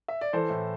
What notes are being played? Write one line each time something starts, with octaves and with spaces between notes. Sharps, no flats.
E5
D5
E3 A4 C5
A2